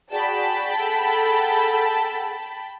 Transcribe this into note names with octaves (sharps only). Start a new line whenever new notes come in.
F#4 G#4 D5 G5 A5 B5
G#4 A4 F#5